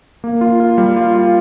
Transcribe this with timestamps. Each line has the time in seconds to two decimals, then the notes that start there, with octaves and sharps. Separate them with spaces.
0.24 A#3
0.41 F4
0.60 F4
0.78 G3
0.96 F4
1.14 F4